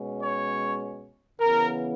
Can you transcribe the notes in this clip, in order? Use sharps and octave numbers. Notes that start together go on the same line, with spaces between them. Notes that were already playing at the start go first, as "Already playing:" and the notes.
Already playing: B2 G#3 C#4
C#5
C#3 E3 B3 A#4